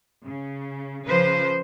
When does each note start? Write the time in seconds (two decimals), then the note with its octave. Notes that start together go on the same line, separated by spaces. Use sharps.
0.24 C#3
1.06 C#3 F3 B4 C5